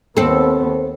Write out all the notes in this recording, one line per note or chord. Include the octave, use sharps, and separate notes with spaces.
D#2 B3 C4 A4